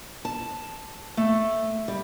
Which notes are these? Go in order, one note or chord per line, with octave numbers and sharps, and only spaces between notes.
A5
A3
G3